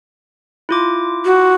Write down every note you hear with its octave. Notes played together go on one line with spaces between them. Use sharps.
E4 F4 D6
F#4